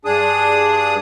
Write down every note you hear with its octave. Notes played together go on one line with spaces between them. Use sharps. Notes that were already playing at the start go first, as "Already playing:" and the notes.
G2 D4 G#4 D#6